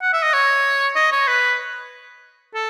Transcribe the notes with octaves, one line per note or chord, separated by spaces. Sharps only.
F#5
E5
D#5
C#5
D#5
C#5
B4
A4